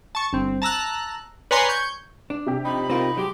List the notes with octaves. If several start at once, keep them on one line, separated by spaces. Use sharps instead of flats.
A5 C#6
G1 C4
A5 A#5 E6 F#6
B4 C#5 D5 G#5 A#5 C6
C#6 G6 G#6
D4
C3 G4
F3 D#4 B5
C4 D#4 F4 A#4
F#3 G#3 G4